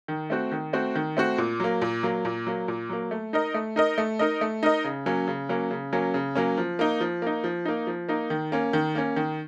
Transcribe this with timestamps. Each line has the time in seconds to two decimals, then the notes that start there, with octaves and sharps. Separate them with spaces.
0.08 D#3
0.30 A3 C4 F#4
0.52 D#3
0.73 A3 C4 F#4
0.95 D#3
1.17 A3 C4 F#4
1.38 A#2
1.60 F#3 A#3
1.82 A#2
2.03 F#3 A#3
2.25 A#2
2.47 F#3 A#3
2.68 A#2
2.89 F#3 A#3
3.11 A3
3.33 D#4 A#4 D#5
3.54 A3
3.76 D#4 A#4 D#5
3.98 A3
4.19 D#4 A#4 D#5
4.41 A3
4.63 D#4 A#4 D#5
4.84 C#3
5.06 F#3 A#3 C#4
5.28 C#3
5.49 F#3 A#3 C#4
5.71 C#3
5.93 F#3 A#3 C#4
6.14 C#3
6.35 F#3 A#3 C#4
6.58 F3
6.79 A#3 D#4
7.00 F3
7.22 A#3 D#4
7.44 F3
7.65 A#3 D#4
7.87 F3
8.08 A#3 D#4
8.30 D#3
8.52 A#3 C#4
8.73 D#3
8.95 A#3 C#4
9.16 D#3